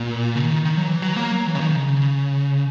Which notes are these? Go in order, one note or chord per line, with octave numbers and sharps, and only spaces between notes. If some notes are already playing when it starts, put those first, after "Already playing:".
Already playing: A#2
C#3
D#3
D#3
F#3
E3
F#3
A#3
F#3
E3
C#3
D#3
C#3